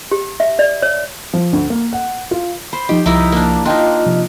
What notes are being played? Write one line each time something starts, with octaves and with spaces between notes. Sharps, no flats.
G4
E5
D5
C#5
F3
D2
A#3
F#5
F4
C5 B5
F3 D#4 G4 D#5
C2 F3 D#4 E4 A#4
A#3 D4
D4 D#4 F4 D#5 F5 G5 C6
C3 F3